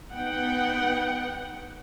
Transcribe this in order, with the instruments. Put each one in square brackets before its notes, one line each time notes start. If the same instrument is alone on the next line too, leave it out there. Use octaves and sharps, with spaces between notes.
[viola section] B3 D#4 F#5 G5